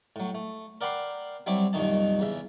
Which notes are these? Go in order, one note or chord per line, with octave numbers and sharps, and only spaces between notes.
A2 F#3
A3
A#4 D5 F#5 G5 B5 C6
F#3 G3 C4 E4 G4
C2 F#2 A#2 D#3 D#4 A5
E2 C#3 E5